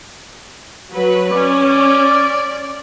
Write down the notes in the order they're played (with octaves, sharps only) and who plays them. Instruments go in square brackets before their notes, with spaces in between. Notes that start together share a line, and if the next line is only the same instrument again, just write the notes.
[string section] F#3 B4
[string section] C#4 [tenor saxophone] D5